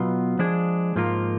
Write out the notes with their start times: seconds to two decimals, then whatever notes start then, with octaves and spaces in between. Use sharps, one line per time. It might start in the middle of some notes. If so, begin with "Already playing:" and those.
Already playing: B2 F#3 B3 F4
0.39 F3 G#3 D4 G#4
0.96 G#2 F3 A#3 F4 A#4